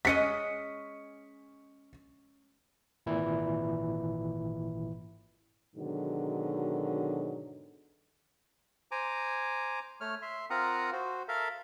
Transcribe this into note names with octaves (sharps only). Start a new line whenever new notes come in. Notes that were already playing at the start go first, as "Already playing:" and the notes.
G#3 C#4 D#5 B6 C#7
G#1 A#2 E3 E4
G#2 B2 D3 D#3 F#3
C5 G#5 A#5 D6
A3 C#5 F6
E5 C6
C4 F4 A#4 F#5 A#5 D#6
F#4 C5
A4 A#4 E5 F5